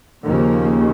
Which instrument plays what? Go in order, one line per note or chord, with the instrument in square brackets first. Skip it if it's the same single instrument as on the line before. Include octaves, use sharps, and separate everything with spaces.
[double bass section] D#2 C#3 F3 A#3